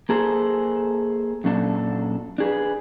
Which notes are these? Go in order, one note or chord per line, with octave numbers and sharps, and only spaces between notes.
A#3 G#4 A4 C5
F#2 A#2 D4 A4
D4 G#4 B4